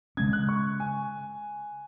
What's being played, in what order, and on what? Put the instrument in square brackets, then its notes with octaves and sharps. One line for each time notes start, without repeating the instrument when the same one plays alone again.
[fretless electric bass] C#3 G#3 C#4 [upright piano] G#6
[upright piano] F#6
C#6
G#5